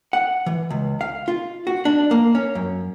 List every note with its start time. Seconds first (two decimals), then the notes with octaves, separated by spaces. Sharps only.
0.13 F#5
0.46 E3
0.71 C#2
1.01 F5
1.28 F4
1.67 F#4
1.85 D4
2.11 A#3
2.35 C#4
2.55 F#2